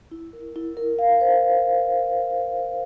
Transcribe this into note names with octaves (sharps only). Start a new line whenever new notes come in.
E4
A#4
E4
A#4
F5
C5